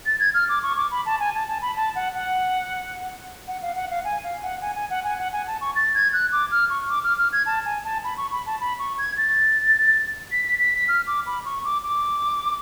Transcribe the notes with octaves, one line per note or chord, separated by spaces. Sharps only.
A6
G#6
F6
D6
C#6
D6
B5
A5
G#5
A5
A5
B5
A5
F#5
F#5
F#5
F5
F#5
F5
G#5
F5
F#5
G#5
G#5
F#5
G#5
F#5
G#5
A5
C#6
A6
G#6
F#6
D6
F6
C#6
D6
F6
F6
G#6
A5
G#5
A5
B5
C#6
B5
A5
B5
C#6
G#6
A6
B6
B6
B6
B6
F6
D6
B5
C#6
D6
D6